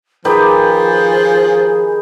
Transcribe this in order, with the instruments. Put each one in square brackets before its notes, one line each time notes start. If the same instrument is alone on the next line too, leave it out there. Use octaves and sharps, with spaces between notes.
[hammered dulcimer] D#3 G4 B4 [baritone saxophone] F3 [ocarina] G#4